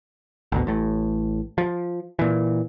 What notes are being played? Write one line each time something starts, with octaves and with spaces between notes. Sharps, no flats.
G#1 D2 B2
A1 A2
F3
A#2 E3